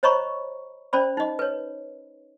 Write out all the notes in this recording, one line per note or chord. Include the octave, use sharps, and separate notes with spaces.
C5 C#5 D#5 A#5 B5 C#6
C#4 C5 D5 B5
D#4 D#5
B4 C#5